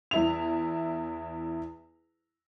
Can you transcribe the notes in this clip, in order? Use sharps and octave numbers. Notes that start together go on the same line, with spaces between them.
E2 E4 F7